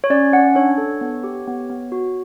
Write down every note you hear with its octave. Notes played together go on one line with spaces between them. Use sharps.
C#5
C#4 D5
C#4 F#5
D4 C#5
A4
B3
G4
B3
B3
F#4